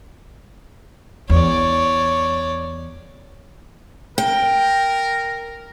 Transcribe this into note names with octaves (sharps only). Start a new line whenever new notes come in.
E2 C#5 D5
A#4 G5